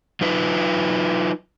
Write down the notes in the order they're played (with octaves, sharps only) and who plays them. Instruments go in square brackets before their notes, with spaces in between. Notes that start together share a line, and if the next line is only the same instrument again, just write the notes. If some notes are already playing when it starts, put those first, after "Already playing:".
[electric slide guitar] F#3 D#4 F4 B4